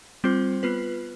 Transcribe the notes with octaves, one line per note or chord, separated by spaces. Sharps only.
G3 C4 F4 C5
B3 F4 B4